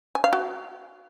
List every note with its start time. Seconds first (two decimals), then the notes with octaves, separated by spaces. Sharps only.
0.15 G#5
0.24 F5
0.33 F#4